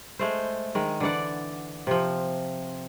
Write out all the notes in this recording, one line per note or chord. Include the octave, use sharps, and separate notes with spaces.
G#3 A3 C5
D#3 G#3
D3 E3 D5 F#5
C3 F3